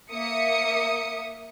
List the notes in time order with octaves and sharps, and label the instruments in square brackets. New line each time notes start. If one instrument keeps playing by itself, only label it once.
[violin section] A#3 E5 D#6 C#7